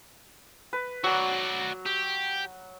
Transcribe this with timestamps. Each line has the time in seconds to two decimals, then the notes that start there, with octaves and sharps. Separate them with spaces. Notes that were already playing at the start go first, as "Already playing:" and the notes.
0.73 B4
1.04 F#3 F#4 D5 A#5
1.86 G4